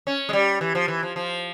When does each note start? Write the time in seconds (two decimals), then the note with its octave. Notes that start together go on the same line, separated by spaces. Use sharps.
0.07 C#4
0.29 G#3
0.33 G3
0.61 E3
0.75 F3
0.88 E3
1.03 F3
1.16 F3